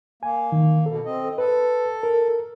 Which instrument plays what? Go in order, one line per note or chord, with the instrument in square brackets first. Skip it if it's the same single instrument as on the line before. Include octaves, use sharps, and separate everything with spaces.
[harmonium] A#3 [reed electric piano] G#5
[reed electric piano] D#3
[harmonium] B2 [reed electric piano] A4
[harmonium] C4 D#5
[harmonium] A4 [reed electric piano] B4
[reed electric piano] A#4